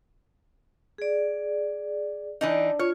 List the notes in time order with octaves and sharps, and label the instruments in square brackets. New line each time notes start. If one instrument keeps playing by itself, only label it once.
[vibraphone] G#4 D5
[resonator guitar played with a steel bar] E3 D4 D#4
[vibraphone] F4 [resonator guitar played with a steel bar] C#5